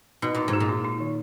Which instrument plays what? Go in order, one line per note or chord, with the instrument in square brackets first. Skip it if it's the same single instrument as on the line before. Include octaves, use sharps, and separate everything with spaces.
[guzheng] B2 [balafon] D#4
[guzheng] A#2 [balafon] D#4
[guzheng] G#2
[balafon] F#4
[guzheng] A#2
[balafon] D#4
D#4
D#3